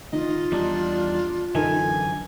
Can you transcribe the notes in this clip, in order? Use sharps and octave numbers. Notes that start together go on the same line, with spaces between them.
D#3 F4 D#5
E2 G3 D4 D#4
F#2 D3 E3 D#4 A4 A#4 G#5